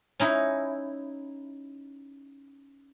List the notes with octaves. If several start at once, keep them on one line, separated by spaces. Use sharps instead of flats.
C#4 D#4 E4